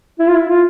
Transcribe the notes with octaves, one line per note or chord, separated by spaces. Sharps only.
E4
F4
E4
F4